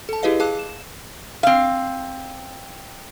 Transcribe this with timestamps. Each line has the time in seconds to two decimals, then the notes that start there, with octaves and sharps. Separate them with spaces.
0.09 A4 A5
0.23 E4 G4 G#4 B4 D#5 F5
0.40 G#4 F5 A5 D6 F#6
0.59 E7
1.43 C4 F5